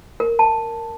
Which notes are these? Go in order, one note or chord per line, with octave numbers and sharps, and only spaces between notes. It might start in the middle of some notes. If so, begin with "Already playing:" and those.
A#4
A5